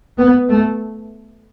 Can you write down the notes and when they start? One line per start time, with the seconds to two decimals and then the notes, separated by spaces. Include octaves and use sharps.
0.19 B3
0.48 A3